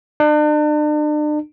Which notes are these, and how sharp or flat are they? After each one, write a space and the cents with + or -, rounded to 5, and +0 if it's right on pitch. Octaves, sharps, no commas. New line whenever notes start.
D4 +40